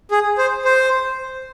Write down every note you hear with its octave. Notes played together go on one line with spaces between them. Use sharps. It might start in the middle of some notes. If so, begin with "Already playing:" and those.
G#4
C5
C5